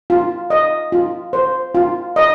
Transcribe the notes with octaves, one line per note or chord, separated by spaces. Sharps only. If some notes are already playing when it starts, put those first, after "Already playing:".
F4
D#5
F4
C5
F4
D#5